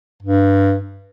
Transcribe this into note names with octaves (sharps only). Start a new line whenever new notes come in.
G2